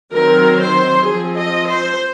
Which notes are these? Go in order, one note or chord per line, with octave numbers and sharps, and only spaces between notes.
D#3 F#3 C4 A#4
C5
F3 C4 G#4
D#5
C5